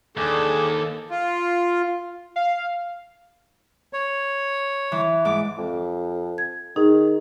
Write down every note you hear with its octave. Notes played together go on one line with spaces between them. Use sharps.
D#2 D4 G#4 A4 D6
F4
F5
C#5
E3
G#2 D6
F2
G#6
D#3 D#4 G#4